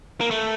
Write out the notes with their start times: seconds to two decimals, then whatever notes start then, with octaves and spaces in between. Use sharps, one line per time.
0.21 A#3
0.31 A3